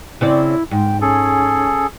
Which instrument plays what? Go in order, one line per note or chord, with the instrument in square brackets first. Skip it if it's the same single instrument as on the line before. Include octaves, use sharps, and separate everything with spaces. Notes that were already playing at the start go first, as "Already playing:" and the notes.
[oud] C#3 C4 D5 [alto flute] E4
[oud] G#2 [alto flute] G5
[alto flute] C#4 [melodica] G#4 A4